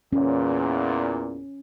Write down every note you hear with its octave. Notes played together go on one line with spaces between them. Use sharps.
E2 A#2 C#4